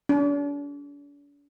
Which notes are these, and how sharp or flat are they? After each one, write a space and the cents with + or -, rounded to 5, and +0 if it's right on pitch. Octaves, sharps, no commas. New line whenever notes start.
D4 -45